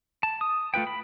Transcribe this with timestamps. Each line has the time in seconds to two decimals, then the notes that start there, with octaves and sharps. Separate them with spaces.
0.23 A5
0.41 D#6
0.74 A3 F4 B4 G5
0.87 B5